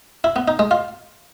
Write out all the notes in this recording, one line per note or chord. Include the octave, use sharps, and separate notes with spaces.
E4
B3
D#4
G#3
F4